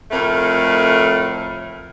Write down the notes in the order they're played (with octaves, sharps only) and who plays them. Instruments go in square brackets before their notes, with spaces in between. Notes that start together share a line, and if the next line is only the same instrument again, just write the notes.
[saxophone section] F2 A2 A3 A#4